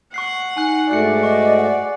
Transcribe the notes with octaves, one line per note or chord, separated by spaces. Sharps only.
F#5 C#6 F#6 C7
D#4 G#5 F#6
G#2 A3 F#4 D5 F#6 C#7
D#5 C#6
F#5